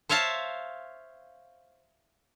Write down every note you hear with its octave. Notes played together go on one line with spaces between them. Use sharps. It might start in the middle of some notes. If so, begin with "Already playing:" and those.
C5 C#5 E5 F5 A5